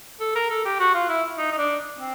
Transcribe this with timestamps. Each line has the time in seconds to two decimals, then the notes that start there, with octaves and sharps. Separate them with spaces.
0.20 A4
0.35 A#4
0.50 A4
0.65 G4
0.79 F#4
0.94 F4
1.09 E4
1.38 D#4
1.51 D#4
1.58 D4
1.97 C4